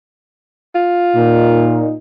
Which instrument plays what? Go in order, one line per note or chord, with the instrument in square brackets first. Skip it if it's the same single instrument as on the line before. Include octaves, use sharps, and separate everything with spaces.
[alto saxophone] F4
[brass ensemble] A#2 D#4